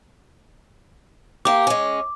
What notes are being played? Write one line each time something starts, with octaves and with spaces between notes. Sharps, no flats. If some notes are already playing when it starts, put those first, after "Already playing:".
A#3 G4 D6
G#3 C#4